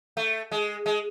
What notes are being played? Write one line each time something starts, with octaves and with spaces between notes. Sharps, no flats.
A3
G#3
G#3